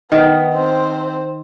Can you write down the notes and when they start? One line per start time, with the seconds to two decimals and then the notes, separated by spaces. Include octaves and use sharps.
0.12 D#3 B3
0.54 C4 C5